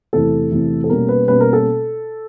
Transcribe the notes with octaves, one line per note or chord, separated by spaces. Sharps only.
E2 C3 E3 A3 A4
E2 C3 E3 A3
A4
B2 G3 A#3 C#4 A#4
B4
B2 G3 A#3 C#4 B4
A#4
A4